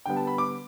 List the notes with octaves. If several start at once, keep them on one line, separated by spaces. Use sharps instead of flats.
D3 G3 B3 G5
A5
B5
D6